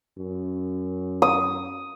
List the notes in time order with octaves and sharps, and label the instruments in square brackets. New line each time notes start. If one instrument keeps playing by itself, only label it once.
[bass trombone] F#2
[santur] D#6